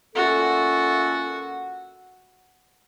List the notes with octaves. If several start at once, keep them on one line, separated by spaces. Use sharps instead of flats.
A#2 A3 C#4 F#4 A4